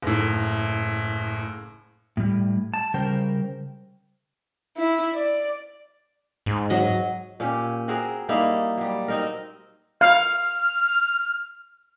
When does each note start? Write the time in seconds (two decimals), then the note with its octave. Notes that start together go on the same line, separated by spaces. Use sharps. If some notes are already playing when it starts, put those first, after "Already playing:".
0.03 F#1 A2
2.17 A2 G3
2.74 A5
2.94 C#3 G3 A#4 C5 G5
4.77 E4
5.13 D5
6.46 G#2
6.70 F#3 D#5
7.40 A#2 C#4 G4
7.88 C4 F#4 G#4 A#4
8.29 G3 A#3 D#4 E4
8.77 F#3 G3
9.08 C4 D#4 A#4
10.01 F5 F6